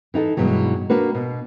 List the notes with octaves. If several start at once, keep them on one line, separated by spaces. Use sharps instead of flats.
E3 D#4 G4 A4
G2 B2 E3 F#3 G#3
A#3 D4 F#4 B4
B2